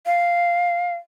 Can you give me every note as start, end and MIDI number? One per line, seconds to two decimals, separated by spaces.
0.06 0.94 77